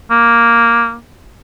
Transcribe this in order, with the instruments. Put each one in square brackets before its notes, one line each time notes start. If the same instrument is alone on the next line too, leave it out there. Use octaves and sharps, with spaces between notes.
[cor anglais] A#3